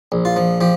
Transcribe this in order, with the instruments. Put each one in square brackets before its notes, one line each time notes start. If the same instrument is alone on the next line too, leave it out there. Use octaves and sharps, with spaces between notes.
[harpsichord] A#1
F4
F3
F3 G4